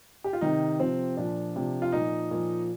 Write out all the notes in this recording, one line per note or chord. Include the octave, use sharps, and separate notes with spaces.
G4
F4
C3 D#3 D#4
C3 F3 C4
A#2 F3 D4
C3 F3
F4
A#2 F3 D#4
A#2 F3